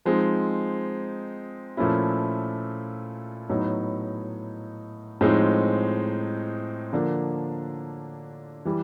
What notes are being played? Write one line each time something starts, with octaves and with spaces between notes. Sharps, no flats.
F3 G#3 C4 D#4
A#2 F3 A3 C#4 E4
A2 F#3 B3 D#4
A2 F3 G#3 C4 D#4
D3 F3 A#3 D4
E3 G3